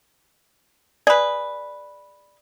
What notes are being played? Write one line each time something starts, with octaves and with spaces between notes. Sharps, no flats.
G#4 B4 D5